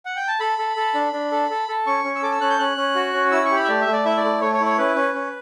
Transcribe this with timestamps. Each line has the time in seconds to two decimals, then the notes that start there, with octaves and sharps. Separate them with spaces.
0.05 F#5
0.16 G5
0.28 A5
0.40 A4 B5
0.58 A4
0.76 A4
0.94 D4
1.13 D4
1.32 A4
1.50 A4
1.68 A4
1.86 C#4 C#6
2.04 C#4
2.16 E6
2.23 A4 D6
2.32 E6
2.41 C#4 F#6
2.50 G6
2.59 C#4 F#6
2.77 C#4
2.95 F#4
3.14 C#4
3.32 E4 E6
3.45 C#6
3.51 G4
3.56 B5
3.64 E5
3.69 A3 D5
3.81 E5
3.87 A3
3.92 D5
4.05 E4 E5
4.17 D5
4.24 A3
4.41 A3 C#5
4.53 C#5
4.60 E4
4.66 C#5
4.78 C#4 B4
4.96 C#4
5.15 C#4